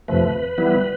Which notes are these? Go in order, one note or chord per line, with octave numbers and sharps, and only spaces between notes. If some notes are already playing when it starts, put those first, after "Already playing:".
F2 C3 F3 A3 B4
E3 G3 B3 E4